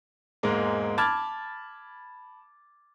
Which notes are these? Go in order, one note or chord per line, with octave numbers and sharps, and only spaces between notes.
E1 G#2 G#3 A#3
A5 B5 D6 F6 G#6 A6